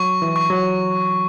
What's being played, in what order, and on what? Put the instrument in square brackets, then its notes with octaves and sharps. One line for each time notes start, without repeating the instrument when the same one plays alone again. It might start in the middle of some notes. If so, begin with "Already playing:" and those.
Already playing: [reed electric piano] F#3 [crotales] C#6
[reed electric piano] E3
[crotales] C#6
[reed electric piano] F#3